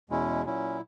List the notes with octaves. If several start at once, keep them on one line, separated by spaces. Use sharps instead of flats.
E2 B2 G#3 C#4 E4
A#2 F#3 C#4 E4